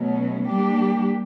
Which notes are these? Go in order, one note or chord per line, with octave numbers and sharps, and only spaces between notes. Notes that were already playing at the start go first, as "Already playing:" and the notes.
Already playing: B2 F#3 A3 C#4
G3 A#3 D4 G4